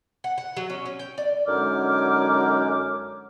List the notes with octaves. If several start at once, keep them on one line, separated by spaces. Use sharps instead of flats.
F#5
F#5
F#3
C#4
C#4
G5
D5
F#2 D3 G#3 D#4 D6 F6